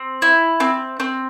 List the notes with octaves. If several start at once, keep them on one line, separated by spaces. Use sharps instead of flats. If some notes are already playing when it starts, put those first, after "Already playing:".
Already playing: C4
E4
C4
C4